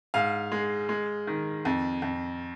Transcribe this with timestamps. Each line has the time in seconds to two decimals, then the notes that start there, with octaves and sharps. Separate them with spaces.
0.14 G#2 F5
0.52 G#3
0.89 G#3
1.27 D#3
1.65 F2
2.02 F2